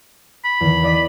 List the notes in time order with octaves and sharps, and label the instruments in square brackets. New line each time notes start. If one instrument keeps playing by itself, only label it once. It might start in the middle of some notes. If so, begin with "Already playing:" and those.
[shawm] B5
[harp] E2 D#3
B4 D5 D#5